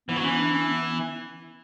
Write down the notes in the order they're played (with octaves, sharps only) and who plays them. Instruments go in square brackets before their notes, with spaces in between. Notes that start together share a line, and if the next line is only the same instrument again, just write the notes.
[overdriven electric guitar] E3 [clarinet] B3
[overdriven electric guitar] F#3
[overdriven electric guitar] E3 [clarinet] C#4
[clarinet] D4
C#4
B3